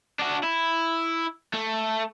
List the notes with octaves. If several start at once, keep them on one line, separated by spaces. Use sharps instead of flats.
D4 F#4
E4
A3